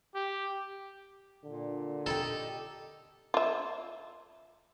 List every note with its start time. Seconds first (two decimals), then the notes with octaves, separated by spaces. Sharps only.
0.15 G4
1.44 A#2 D3
2.06 D#4 E4 G4 A4
3.34 F4 E5